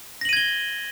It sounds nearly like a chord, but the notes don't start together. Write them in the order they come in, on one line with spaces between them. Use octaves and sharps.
A#6 F#7 D#7 G#6 G7